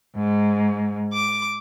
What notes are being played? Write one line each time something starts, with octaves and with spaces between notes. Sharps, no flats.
G#2
D6